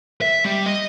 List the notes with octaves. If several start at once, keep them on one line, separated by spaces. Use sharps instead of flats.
E5
G3
D#5